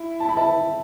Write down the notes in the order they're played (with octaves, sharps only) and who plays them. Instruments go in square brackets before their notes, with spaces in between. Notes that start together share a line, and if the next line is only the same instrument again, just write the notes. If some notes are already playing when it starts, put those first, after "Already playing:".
Already playing: [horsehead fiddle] E4
[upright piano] A5
B5
E5 A5